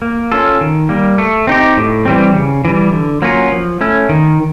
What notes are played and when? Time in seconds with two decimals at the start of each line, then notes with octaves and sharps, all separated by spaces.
0.02 A#3
0.32 C#4 F4 A4
0.61 D#3
0.89 G3 A#3
1.18 A3
1.47 C4 D#4 G4
1.77 A2
2.05 E3 G3 C4
2.34 C#3
2.65 E3 G3
2.92 D3
3.22 F#3 A#3 C#4 F4
3.52 F3
3.81 A3 C#4 E4
4.09 D#3